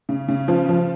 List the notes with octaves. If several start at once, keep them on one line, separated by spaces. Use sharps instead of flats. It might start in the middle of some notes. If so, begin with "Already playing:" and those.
C#3
C#3
F3
F3